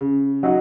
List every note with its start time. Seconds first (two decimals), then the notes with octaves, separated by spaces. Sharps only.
0.01 C#3
0.43 F#3 D#4 F#4